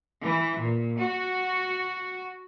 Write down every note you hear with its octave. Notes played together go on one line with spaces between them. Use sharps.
E3
A#2
F#4